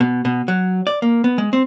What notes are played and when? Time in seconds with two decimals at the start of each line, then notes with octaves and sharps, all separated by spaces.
0.01 B2
0.25 B2
0.48 F#3
0.87 D5
1.02 A#3
1.24 B3
1.38 G#3
1.53 C4